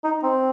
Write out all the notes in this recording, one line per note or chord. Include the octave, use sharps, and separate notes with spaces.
D#4
C4